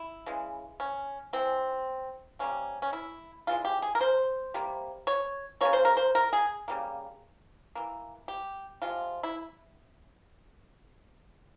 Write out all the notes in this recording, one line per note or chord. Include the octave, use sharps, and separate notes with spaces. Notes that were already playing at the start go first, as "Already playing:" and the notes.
Already playing: E4
C#3 E3 G#3
C#4
E3 G#3 C4
C3 E3 G3 A#3 C#4
C#4
E4
C#3 E3 G#3 F4
G4
G#4
A#4
C5
C3 G3 A#3
C#5
C#3 F3 A#3 C#5
C5
A#4
C5
A#4
G#4
C#3 G3 A#3
E3 A#3
G4
C3 F3 G#3 F4
E4